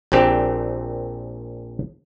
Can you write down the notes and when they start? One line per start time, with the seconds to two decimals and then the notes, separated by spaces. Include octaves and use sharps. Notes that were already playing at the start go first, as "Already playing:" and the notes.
0.12 A#1 A#2 C4 G4